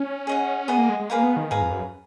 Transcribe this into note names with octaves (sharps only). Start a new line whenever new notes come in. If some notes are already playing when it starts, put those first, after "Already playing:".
Already playing: C#4
G#4 D#5 F#5
B3 G#4 D#5 F#5
A#3
G#3
G#3
A#3 G#4 B4 F5 A#5
B3
D#3
G#2 G#4 B4 F5 A#5
F2
F#2